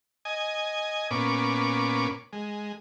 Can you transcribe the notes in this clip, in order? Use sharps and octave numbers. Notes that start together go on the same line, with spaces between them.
D#5 G#5
A#2 B3 C#4 D6
G#3